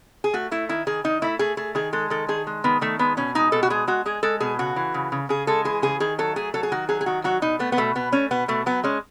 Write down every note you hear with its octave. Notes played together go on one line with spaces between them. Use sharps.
G#4
A3 F#4
A3 E4
D#3 E4
D#3 G#4
D#3 D#4
A3 E4
A3 G#4
A3 G#4
D#3 G#4
G#3 A4
D#3 A4
D#3 G#4
G#3
D#3 B3
D#3 A3
G#3 B3
B2 C#4
G#3 D#4
B2 A4
F#4
G#3 G#4
G#3 F#4
G#3 G#4
G#3 A4
B2 G#4
C#3 F#4
E3
C#3
C#3
C#3 G#4
G#3 A4
E3 G#4
C#3 G#4
D#3 G#4
F#3 A4
A3 G#4
F#3 A4
G#4
D#3 F#4
F#3 G#4
G#4
D#3 F#4
F#3 F#4
B2 D#4
A3 B3
B3
B2 A3
B2 B3
A3 C#4
B2 B3
B2 A3
F#3 B3
G#3 C#4